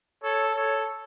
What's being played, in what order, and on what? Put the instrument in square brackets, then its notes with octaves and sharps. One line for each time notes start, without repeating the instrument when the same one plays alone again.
[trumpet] A4 [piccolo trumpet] C#5
[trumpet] A4 [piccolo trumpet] C#5